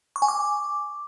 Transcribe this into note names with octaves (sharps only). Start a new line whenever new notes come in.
C#6
G#5
D6